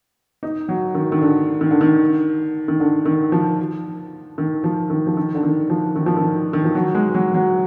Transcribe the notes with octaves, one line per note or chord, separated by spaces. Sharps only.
D#4
F#3
D#3
D#3
D3
D#3
D3
D#3
D#3
D3
D#3
F3
D#3
F3
D#3
F3
D#3
D3
D#3
F3
D#3
F3
D#3
D#3
F3
F#3
G#3
F#3
F#3